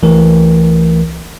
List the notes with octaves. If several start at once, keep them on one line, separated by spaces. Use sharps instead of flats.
C2 E3 A3 A#4